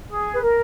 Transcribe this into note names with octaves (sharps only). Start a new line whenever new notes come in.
G#4
B4
A#4